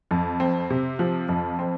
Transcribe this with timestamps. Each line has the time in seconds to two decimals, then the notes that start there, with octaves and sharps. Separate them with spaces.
0.11 F2
0.40 C4
0.70 C3
0.99 F3
1.29 F2
1.59 C4